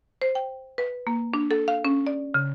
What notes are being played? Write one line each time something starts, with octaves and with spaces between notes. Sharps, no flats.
C5
G5
B4
A#3
D4
A4
F5
C#4
D5
C#3